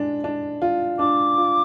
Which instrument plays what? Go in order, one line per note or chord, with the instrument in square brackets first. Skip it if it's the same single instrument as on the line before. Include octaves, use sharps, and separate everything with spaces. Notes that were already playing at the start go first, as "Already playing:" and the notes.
Already playing: [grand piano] G#3 D4
D4
F4
[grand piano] D4 [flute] D6
[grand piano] F4